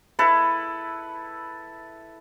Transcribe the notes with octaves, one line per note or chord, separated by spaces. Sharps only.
E4 A4 B4